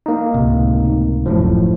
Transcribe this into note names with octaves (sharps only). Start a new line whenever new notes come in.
A#3 D#4
C#2 A2 C3
D1 F#2 A2 F3